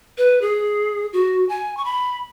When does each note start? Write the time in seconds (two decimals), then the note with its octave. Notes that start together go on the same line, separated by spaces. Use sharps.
0.18 B4
0.41 G#4
1.13 F#4
1.49 G#5
1.77 C#6
1.85 B5